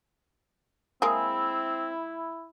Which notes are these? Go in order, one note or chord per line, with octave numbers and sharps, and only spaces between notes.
G#3 A#3 C4 E4 G#4